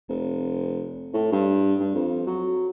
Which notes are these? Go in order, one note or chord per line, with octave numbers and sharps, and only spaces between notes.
F1
A2
G2
G2
F2
F#3